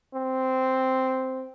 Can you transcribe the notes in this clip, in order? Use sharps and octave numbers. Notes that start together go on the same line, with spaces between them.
C4